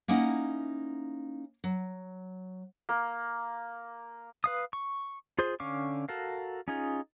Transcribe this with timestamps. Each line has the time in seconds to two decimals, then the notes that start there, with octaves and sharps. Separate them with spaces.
0.08 A#3 C#4 D#4 E4 F#5
1.64 F#3
2.89 A#3
4.44 B4 F5 D#6
4.73 C#6
5.39 F4 G#4 C5
5.60 D3 C#4 F5 C#6 D6
6.09 F#4 A4 A#4 F5
6.68 C#4 D#4 F4 G#4